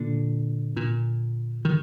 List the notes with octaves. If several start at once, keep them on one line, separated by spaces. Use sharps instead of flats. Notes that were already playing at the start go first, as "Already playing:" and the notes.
Already playing: A#2 D3
A#2
D#3